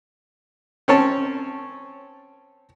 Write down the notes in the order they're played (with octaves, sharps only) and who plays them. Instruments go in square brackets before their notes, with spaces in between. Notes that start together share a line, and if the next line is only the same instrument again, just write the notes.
[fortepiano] C4 C#4 C#5 A5